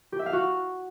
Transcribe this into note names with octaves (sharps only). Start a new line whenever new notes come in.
G4
E5
F5
F#4